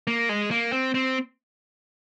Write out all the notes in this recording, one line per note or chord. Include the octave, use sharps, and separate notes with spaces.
A#3
G#3
A#3
C4
C4